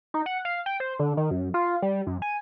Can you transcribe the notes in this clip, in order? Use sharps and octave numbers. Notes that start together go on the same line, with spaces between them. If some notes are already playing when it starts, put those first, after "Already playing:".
D#4
F#5
F5
G5
C5
D3
D#3
F#2
F4
G3
F#2
G#5